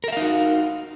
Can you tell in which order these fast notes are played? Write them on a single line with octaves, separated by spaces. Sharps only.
A#4 E5 F5 D#4 F#4